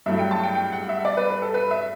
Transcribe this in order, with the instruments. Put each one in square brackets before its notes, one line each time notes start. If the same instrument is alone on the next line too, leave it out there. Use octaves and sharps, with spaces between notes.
[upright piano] G2 F#3 A3 E4 E5
G5
A5
G5
G5
F#5
E5
D5
B4
B4
A4
B4
E5